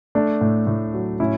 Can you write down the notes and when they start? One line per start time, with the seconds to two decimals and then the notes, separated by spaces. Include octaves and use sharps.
0.15 A3 D4
0.41 A2
0.67 A2
0.94 F#3
1.20 A2 C#4 E4